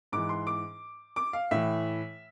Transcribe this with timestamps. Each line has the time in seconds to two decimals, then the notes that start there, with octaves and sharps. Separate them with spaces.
0.12 G#2 E3 D6
0.29 C6
0.47 D6
1.16 D6
1.33 F5
1.51 A2 E3 E5